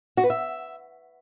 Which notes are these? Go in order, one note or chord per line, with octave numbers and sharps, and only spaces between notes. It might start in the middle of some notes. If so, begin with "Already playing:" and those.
F#4
B4
E5